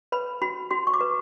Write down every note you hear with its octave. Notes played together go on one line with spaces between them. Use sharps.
B4 B5
F#4 B5
F#4 C6
C#6
D6
B4